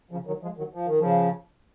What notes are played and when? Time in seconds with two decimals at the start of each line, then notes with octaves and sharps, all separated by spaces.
0.11 C#3 F3
0.27 D#3 F#3
0.42 F3 G#3
0.57 D#3 F#3
0.74 F3
0.86 D#3
0.99 C#3 F3